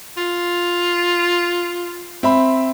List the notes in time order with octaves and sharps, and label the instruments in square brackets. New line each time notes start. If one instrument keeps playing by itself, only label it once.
[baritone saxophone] F4
[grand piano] C4 E5 B5